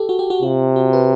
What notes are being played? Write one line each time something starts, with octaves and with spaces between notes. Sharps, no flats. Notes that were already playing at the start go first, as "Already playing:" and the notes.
Already playing: G4 A4
F#4
G4
F#4
C3 F4
F#4
B4